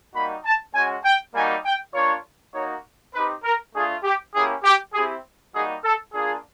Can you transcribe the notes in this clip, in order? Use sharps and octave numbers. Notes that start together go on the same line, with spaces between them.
G3 A#3 D#4 F#4 B5
A5
G#3 C#4 F#4 G#5
G5
G3 A#3 D#4 F#4 G#5
G5
A#3 D4 F4 C#5
A#3 D#4 F#4 C#5
C4 D#4 G4 B4
A#4
A3 D4 F4 G#4
G4
A#3 C#4 E4 G4 G#4
G4
C4 E4 G4 G#4
G3 A#3 D#4 F#4 G#4
A4
A#3 D4 F4 G#4